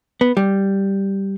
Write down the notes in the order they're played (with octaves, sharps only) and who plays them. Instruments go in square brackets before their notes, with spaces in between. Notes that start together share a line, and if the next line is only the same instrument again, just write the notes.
[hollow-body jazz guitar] B3
G3